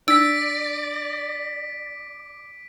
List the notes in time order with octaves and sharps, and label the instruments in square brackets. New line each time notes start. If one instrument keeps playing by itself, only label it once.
[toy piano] D4 [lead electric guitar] D5 [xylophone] E6 [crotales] B6 D7